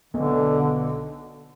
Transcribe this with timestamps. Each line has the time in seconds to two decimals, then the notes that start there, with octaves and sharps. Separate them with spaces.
0.14 B1 B2 D3